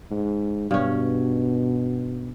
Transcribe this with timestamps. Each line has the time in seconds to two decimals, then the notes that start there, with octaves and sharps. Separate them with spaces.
0.11 G#2
0.71 G2 B2 C#4